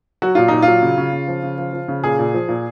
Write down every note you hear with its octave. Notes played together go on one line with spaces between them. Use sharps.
F#3 F#4
A#2 F4
A#2 D#4
F4
F#3
C#3
C#3
C#3
F3
C#3
F3
F3
C#3
A#2 G#4
A#2
F3
A#2